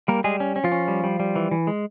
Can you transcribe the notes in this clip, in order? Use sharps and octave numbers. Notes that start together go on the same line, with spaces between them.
G3 A#3 A#4
G3 G#3 G#4
C#4
C#4
F3 F4
C#4
G3
G3
G3
E3
E3
G#3